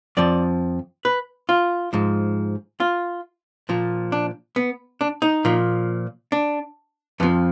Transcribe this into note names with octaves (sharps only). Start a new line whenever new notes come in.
F2 F3 D5
B4
F4
G#2 F3
F4
A#2 F3
D4
B3
D4
D#4
A#2 F3
D4
F2 F3 B3